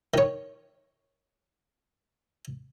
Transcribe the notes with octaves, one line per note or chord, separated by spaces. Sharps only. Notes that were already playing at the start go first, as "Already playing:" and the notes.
D#3 C#5